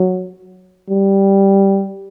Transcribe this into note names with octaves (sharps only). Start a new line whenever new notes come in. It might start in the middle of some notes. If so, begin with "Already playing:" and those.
Already playing: F#3
G3